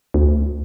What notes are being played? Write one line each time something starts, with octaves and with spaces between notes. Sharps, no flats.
D2